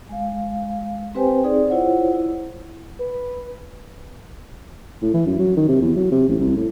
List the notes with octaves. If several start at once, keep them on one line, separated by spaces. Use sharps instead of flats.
G#3 F5
C4 G4 B4 C5 G5 G#5
C4 D#4 G#4 D5
E4 F4 C5 C#5 F#5
E4
B4
A2
E3
F#2
F#3
D#3
C3
E2
F#3
C3
A1
C2
A2